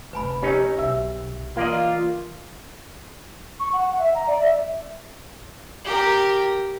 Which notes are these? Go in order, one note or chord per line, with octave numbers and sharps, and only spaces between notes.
F1 D2 B4 G#5 B5
C#4 D#4 G4 A#4 C#5
B1 E5
E3 A#3 F4 D5 D#5
C#6
F#5
F#5
E5
A#5
D5
E5
G4 A#4